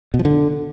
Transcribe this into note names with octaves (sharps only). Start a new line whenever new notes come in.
B2
F3
D3